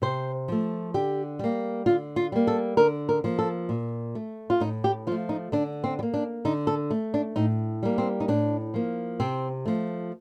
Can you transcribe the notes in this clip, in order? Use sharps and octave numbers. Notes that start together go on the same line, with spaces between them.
C3 C5
F3 A3
D3 G4
G3 A#3
D3 F4
F4
G3 A#3
A4
D3 A#4
A#4
F3 A#3
A4
A#2
A3
F4
A2 D#4
G4
F3 A3 F4
D#4
D3 D4
C4
G3
A#3
D4
D3 D#4
A4
A3
D4
A2 D#4
G3 A#3
C4
D#4
A2 D4
F3 A#3
C3 C4
F3 A3